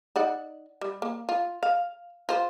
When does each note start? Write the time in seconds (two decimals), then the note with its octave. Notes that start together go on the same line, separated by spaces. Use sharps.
0.16 D#4 D5 F#5
0.81 G3
1.02 A#3
1.29 F4
1.63 F5
2.29 F4 C5